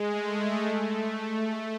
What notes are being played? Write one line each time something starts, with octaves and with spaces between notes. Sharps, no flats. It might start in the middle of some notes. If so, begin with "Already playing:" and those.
Already playing: G#3
A3
A3